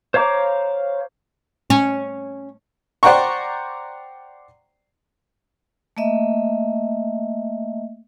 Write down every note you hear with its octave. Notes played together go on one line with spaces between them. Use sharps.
C5 C#5 F5 A#5 D6
C#4
C5 D5 F#5 G5 A#5 C#6
A3 A#3 D#5 E5